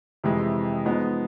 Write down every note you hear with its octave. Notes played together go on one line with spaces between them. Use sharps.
F2 C3 E3 G#3
F3 G#3 B3 D#4